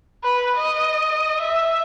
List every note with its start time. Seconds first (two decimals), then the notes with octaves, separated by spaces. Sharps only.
0.24 B4
0.56 D#5
1.41 E5